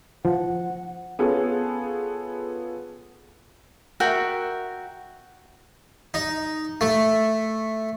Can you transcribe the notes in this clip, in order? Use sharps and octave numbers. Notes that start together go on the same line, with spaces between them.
F3 F#5
B3 C#4 F4 G#4 A4
F#4 A#4 E5 G5
D#4
A3